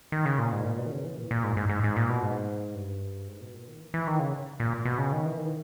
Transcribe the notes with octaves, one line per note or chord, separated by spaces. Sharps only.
D#3
C#3
A#2
G#2
A#2
B2
D#3
C#3
E3
A#2
A#2
G#2
G#2
G#2
G#2
A#2
B2
G#2
G2
G#2
B2
A#2
D#3
E3
E3
D#3
C#3
A#2
B2
C#3
D#3
E3
D#3